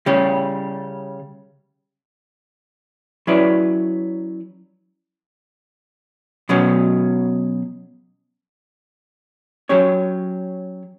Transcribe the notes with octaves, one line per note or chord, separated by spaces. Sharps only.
C#3 G3 C#4
F#3 C#4 E4 B4 D5
B2 F#3 C#4
F#3 C#4 G4 C#5